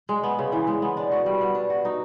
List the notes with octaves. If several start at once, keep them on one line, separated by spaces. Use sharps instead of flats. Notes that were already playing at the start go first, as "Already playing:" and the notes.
G#3
B3
C#3
E3
G#3
B3
D4
F#4
G3
B3
D4
F#4
D#4